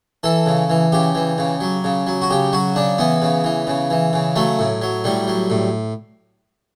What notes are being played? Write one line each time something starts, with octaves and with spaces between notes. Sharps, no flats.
E3 A4
C#3
E3
C#3 G4
E3
C#3
F#3
C#3
F#3
F#4
C#3 G4
F#3 F#4
C#3 D4
E3 B3
C#3
E3
C#3
E3
C#3
F#3 A3
A2
F#3
A2 G3
F#3
A2